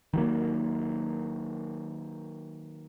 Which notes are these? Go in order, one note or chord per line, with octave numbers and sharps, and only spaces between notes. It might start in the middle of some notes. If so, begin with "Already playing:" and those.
D#3 F#3 A#3